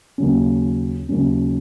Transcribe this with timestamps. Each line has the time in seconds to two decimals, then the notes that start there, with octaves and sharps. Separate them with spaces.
0.18 D#2 C#3 F#3 C#4
1.09 D#2 C#3 F#3 C#4